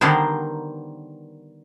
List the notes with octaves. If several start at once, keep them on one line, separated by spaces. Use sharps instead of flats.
D3 D#3 G3 B3 A#4 C5